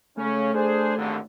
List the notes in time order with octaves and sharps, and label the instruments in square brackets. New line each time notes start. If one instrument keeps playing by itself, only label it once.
[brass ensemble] C#3 C#4 [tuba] A3
[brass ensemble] D4 G#4 C5
G#1 D#2 D3